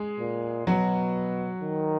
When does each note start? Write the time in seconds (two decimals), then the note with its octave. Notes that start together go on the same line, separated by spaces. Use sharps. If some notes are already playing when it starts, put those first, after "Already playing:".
Already playing: G#3 G#4
0.20 A#2
0.67 B2 F#3 F#4
1.61 D#3